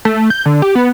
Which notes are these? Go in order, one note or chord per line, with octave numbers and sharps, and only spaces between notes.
A3
G6
D3
G4
B3